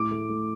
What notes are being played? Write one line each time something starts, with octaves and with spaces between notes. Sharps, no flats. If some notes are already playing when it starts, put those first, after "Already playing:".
Already playing: A2 D6
A3
A3